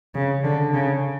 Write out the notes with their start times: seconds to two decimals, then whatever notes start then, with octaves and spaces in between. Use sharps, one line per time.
0.14 C#3
0.44 D3
0.73 C#3